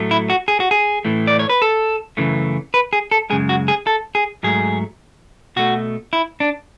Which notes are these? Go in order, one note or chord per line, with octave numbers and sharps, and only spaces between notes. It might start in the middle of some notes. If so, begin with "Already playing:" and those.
Already playing: A2 F#3 A3
E4
F#4
G#4
F#4
G#4
A2 E3 A3
D5
C#5
B4
A4
F#2 C#3 E3 A3
B4
G#4
A4
F#2 C#3 G#3 G#4
F#4
G#4
A4
G#4
G#2 F#3 A3 G#4
B2 A3 F#4
E4
D4